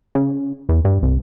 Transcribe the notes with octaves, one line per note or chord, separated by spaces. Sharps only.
C#3
E2
G2
C2